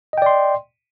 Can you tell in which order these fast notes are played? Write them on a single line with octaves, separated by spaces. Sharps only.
D#5 G5 D5 C6